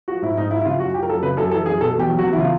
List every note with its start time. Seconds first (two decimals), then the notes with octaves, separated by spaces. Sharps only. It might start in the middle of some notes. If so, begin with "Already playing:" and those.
0.08 F3 F#4
0.22 G#2 E4
0.37 G#2 D#4
0.51 F3 E4
0.61 E4
0.65 C#3 F4
0.80 F#2 F#4
0.94 F3 G4
1.03 A#4
1.09 F#2 A4
1.23 C#3 B4
1.37 F#2 A4
1.51 E3 A4
1.66 F#2 G#4
1.81 B2 A4
1.95 E2 G4
2.09 F#3
2.19 F#4
2.23 E2
2.33 E4
2.38 C#3 F4